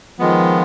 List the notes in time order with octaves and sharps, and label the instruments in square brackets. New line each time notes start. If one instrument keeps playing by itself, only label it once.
[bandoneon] D#3 G#3 B3 [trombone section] F3